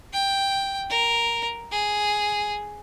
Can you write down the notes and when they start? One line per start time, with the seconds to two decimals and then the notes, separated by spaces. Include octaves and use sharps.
0.13 G5
0.90 A#4
1.72 G#4